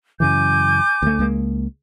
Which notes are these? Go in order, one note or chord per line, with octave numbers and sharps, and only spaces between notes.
F#2 C#3 E3 G#5 D6 G6
D2 A3
C#2 G#3 A#3